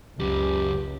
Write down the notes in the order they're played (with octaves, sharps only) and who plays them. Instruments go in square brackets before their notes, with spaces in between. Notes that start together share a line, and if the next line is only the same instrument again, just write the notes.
[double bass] C#2 [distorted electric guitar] F#2 C#3 [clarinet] G4